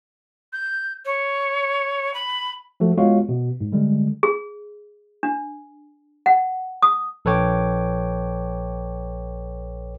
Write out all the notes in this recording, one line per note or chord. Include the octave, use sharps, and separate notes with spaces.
G6
C#5
B5
F3 A3 F#4 A4
G#3 B3 F4 F#4 C#5 F5
B2
G#2
D3 G3 G#3
G#4
D4
F#5
D#6
A#1 A4 B4 C#5 G5 D6